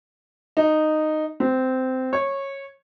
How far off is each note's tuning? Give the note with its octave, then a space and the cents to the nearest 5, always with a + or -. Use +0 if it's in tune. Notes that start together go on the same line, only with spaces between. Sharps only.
D#4 -10
C4 -15
C#5 -15